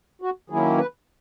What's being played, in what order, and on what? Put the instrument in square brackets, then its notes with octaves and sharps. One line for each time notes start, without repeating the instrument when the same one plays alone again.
[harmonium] F#4
D#3 F#3 A#3 C#4 E4 G#4
B4